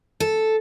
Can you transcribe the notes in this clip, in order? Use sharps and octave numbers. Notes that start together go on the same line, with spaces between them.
A4